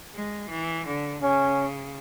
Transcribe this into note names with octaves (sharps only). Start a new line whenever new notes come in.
G#3
E3
D3
C#3 C#4